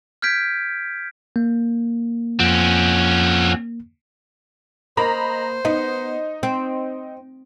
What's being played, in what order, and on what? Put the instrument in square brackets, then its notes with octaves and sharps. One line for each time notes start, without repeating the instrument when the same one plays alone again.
[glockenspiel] F6 G6 G#6 B6 D7
[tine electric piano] A#3
[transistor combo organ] F2 F#5 [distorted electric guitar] C4 C#4
[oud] A#3 [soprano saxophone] C5 [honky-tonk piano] D#5 A#5 B5
[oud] B3 [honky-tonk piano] D#4
[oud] C4